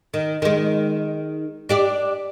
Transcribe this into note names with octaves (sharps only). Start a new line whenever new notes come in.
D#3
D#3 G#3
D4 G4 D5